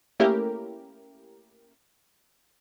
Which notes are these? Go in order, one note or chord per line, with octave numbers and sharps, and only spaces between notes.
A3 A#3 C#4 E4 G4 A#4